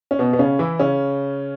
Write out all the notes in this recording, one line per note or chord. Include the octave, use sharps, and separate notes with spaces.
C#4
B2 B3
B3
C#3 C#4
E3 E4
C#3 C#4